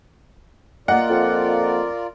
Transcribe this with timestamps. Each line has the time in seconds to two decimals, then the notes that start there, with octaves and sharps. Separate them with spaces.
0.88 A#3 F4 A#4 D5 D#5 F#5
1.10 F2